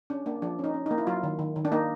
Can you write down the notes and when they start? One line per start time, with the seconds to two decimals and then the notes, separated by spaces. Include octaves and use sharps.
0.10 C#4 D4
0.26 A#3 D4
0.42 F3 D4
0.59 C#4 D#4
0.74 C#4
0.86 A#3 D#4
0.98 E4
1.07 F#3 F4
1.23 D#3
1.39 D#3
1.56 D#3
1.65 D4
1.72 A#3 D#4